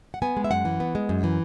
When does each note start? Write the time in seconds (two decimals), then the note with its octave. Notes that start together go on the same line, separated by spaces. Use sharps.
0.14 F#5
0.22 B3 G#5
0.37 G#3
0.44 E5
0.51 F#2 F#5
0.65 E3
0.80 B3
0.95 G#3
1.09 F#2
1.24 E3